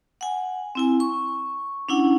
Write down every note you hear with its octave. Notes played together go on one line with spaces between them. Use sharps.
F#5 G#5
C4 E4 G#5
C#6
C#4 D4 E4 F#5